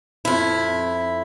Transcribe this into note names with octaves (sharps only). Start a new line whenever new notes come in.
F2 E4